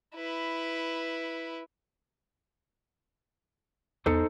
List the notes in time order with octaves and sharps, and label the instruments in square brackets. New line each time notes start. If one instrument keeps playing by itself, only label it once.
[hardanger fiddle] E4 B4
[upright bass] E2 B3 [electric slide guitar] D#4 A4 C5